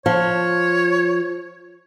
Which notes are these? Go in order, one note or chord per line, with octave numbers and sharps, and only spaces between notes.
F3 C#5